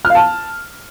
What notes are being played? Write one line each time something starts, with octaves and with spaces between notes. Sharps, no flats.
F6
F5
A5